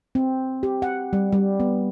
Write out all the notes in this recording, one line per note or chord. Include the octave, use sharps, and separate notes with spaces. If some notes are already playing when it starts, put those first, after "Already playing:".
C4
G4
F#5
G3
G3
B3